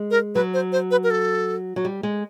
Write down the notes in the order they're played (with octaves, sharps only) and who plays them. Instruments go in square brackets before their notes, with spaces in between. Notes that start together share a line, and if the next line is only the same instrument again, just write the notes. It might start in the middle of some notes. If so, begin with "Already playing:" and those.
Already playing: [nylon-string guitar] G#3
[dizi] A#4
[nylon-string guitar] F#3 [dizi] B4
[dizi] C5
C5
B4
A#4
A4
[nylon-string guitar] F#3
G3
G#3